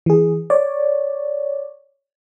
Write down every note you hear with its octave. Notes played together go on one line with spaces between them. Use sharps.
E3 G#4
C#5 D5